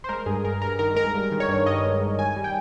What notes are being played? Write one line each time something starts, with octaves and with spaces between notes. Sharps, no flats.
C5
G#3 A#4
G2 G#4
G2 A#4
G2 A#4
D#3 A#4
G#3 A#4
G2
D#3
C#5
G2
G2 D#5
G#3
G2
D#3 G#5
G3
G5